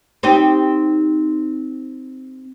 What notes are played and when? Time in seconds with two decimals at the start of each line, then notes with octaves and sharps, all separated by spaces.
0.23 C4 D#4 G4